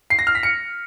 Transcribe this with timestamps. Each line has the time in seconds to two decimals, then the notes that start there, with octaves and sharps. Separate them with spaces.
0.10 C7
0.19 A#6
0.27 F6
0.35 B6
0.43 C#7